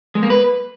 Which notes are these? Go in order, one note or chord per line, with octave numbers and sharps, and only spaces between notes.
G#3
A#3
B4